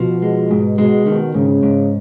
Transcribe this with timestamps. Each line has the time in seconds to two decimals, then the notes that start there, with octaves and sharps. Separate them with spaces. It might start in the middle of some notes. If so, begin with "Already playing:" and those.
Already playing: B2 F3
0.22 G#3
0.51 G#2
0.78 B2 G#3
1.06 B2 D#3
1.35 G#2 C#3
1.63 G#2